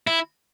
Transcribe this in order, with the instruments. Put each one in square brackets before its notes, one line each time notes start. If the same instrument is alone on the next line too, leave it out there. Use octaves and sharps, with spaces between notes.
[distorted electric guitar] E4